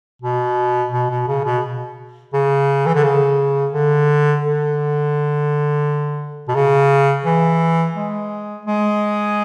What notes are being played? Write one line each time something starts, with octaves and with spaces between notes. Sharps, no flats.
B2
B2
B2
C#3
B2
C#3
E3
D3
C#3
D3
D3
B2
C#3
E3
G#3
G#3